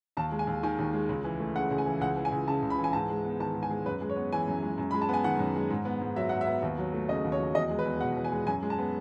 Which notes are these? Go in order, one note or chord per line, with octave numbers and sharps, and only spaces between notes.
D#2 A5
G#3
G#5
D#2
D#3 G#5
D#2
G#3
C#2
E3
A3
C#3 F#5
C#2
G#5
E3
C#2 F#5
E3
G#5
C#2
C#3 A5
C#2
B5
E3
G#5
G#2 A5
G#3
B3
D#3 A5
G#2
G#5
G#3
F#2 B4
G#3
C#5
B3
E3 G#5
F#2
G#3
F#2
G#3 B5
A5
B3 G#5
D#3 F#5
F#2
G#3
G#2
B3
G#2
F#3 E5
G#2 F#5
E5
B3
D#2
F#3
A3
C#3 D#5
D#2
C#5
F#3
E2 D#5
G#3
B4
E2
B2 F#5
E2
G#5
G#3
F#2 G#5
G#3
A5
B3